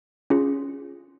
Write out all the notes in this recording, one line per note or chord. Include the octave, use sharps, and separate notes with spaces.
C#4 F4 G#4